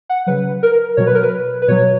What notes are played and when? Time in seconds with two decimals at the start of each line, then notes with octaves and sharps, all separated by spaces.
0.09 F#5
0.27 C#3 F#3 B4
0.63 A#4
0.97 B2 F#3 C#5
1.06 B4
1.15 A#4
1.23 B4
1.62 B4
1.68 B2 F#3 C#5